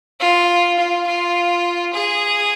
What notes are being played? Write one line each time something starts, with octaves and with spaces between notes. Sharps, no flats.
F4
F4
F4
G#4